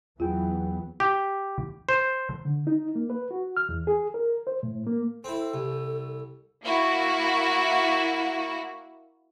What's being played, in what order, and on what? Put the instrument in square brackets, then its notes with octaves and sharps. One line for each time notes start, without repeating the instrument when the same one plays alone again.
[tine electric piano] E2 G#4 G5 [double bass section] E3 F#3 B3 [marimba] F4
[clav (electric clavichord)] G4
C5
[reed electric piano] D3
D#4
A#3
B4
F#4
F6
E2
G#4
A#4
C5
A2
A#3
[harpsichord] C4 E4 [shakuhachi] A4
[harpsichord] C2
[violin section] A#3 E4 F#4